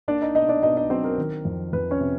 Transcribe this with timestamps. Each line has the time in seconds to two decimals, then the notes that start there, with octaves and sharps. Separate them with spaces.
0.08 A#3 D4 D5
0.22 D#4 D#5
0.35 B2 D#4 D#5
0.49 D4 D5
0.63 B2 D#4 D#5
0.77 D#4 D#5
0.90 F#3 C4 C5
1.04 A#4
1.18 D#3
1.45 F2
1.73 F2 B4
1.91 C#4 C#5
2.00 C3